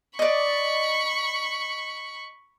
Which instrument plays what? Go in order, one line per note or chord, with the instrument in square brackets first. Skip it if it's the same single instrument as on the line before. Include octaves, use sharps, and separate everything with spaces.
[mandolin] D5 D#5 [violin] B5 C#6